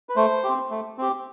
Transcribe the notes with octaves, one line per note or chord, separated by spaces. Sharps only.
B4
A3 C5
C4 G4
A3
C4 G4